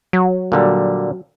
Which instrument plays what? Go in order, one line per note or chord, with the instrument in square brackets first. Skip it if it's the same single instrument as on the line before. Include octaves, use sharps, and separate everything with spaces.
[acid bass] F#3
[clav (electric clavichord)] A#2 D3 G3